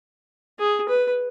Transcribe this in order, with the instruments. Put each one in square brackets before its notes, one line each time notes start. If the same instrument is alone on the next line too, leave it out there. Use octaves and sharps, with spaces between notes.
[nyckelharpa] G#4
B4